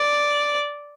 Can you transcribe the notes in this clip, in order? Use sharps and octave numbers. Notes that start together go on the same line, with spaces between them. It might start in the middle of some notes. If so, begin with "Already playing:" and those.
Already playing: D5